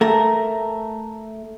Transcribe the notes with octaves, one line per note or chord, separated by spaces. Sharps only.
A3 A#4